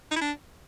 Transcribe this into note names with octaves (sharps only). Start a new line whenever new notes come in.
D#4
E4
D4